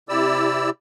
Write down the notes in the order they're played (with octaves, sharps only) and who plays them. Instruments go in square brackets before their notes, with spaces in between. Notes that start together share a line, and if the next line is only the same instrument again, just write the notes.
[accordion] C3 E4 G4 D5 E6